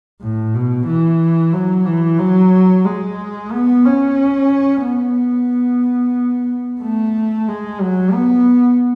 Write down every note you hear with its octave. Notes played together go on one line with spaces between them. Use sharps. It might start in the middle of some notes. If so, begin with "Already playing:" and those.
A2
B2
E3
F#3
E3
F#3
G#3
B3
C#4
B3
A3
G#3
F#3
B3